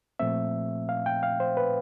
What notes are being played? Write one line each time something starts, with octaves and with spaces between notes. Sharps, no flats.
A#2 F3 A3 C4 E5
F5
G5
F5
C5
B4